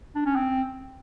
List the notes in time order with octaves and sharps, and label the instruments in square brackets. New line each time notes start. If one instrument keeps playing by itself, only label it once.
[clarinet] D4
C#4
C4